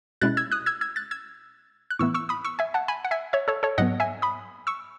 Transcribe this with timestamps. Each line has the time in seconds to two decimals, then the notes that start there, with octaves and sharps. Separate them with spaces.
0.21 B2 G#3 C#4 E4 F#6 A6
0.37 E6 G#6
0.51 D#6 F#6
0.66 E6 G#6
0.81 E6 G#6
0.96 F#6 A6
1.11 E6 G#6
1.90 F#6
1.99 A2 E3 B3 E4 C#6 E6
2.14 C#6 E6
2.29 B5 D#6
2.45 C#6 E6
2.59 E5 G#5
2.74 F#5 A5
2.88 G#5 B5
3.05 F#5
3.11 E5 G#5
3.33 C#5 E5
3.48 A4 C#5
3.63 A4 C#5
3.78 G#2 F#3 B3 D#5 F#5
4.00 E5 G#5
4.22 B5 D#6
4.67 C#6 E6